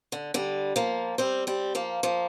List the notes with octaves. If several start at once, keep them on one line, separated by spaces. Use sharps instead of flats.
D3
D3 G3
F3 A#3
G3 C4
G3 C4
F3 A#3
F3 A#3